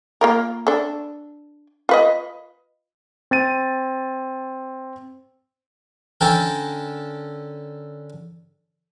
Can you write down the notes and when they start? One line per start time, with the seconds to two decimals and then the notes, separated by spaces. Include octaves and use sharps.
0.21 A#3 F4 A#4
0.67 D4 A4
1.89 F4 B4 D#5
3.31 C4 A6 D#7
6.21 D3 C#4 A4 A#4 G5 A5